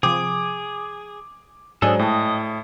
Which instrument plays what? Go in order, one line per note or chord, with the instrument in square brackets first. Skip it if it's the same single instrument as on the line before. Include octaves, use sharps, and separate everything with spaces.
[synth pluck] C3 F3 [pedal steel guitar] G#4 [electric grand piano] D6
[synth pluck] G#2 G#3 [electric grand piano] F#3 [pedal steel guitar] D4 A4 [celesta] C5 D5 G#5
[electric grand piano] A2 [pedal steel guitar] D#5 [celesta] G5 A5